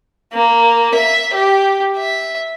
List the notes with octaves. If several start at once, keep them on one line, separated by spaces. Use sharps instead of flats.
A#3
E5
G4
E5